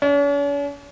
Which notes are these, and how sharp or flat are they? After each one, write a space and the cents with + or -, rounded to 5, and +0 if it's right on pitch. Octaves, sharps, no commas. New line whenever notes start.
C#4 +45